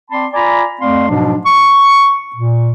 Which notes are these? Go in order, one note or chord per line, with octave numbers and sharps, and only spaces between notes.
C4 D5 A5 B5 C6
F4 D5 G#5 A#5 B5
F2 A3 C4 D5 F5 C6
G#2 B2 F3 F#3 D4
C#6
A#2